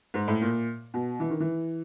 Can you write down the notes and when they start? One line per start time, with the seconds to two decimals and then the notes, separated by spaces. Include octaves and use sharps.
0.14 G#2
0.28 A2
0.41 A#2
0.94 B2
1.20 E3
1.30 D#3
1.40 E3